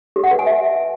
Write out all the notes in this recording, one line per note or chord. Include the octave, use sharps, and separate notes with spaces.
G4
F#5
B4
G#5
E5